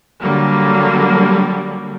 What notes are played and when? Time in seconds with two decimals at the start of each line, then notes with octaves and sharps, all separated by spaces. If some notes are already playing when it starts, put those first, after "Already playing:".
0.21 D3 F#3 G3 A#3